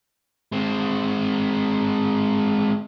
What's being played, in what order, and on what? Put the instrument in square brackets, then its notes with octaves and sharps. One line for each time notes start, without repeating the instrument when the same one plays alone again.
[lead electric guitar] G#3 C4